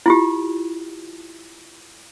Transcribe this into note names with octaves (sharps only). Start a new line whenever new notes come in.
E4 F4 G4